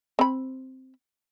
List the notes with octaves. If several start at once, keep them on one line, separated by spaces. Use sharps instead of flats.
C4 B5